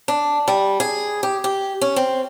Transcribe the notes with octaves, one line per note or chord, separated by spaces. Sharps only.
D4
G3
G#4
G4
G4
C#4
C4